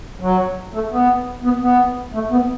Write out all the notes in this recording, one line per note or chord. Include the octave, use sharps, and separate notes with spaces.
F#3
A3
B3
B3
B3
A3
B3